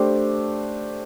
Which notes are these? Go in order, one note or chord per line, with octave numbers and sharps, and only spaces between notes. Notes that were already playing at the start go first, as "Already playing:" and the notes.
Already playing: A3 D4 G4 C5